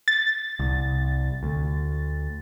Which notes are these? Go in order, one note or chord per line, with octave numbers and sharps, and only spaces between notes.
A6
C2
D2